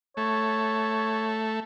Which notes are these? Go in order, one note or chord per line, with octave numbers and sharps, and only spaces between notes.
A3 C#5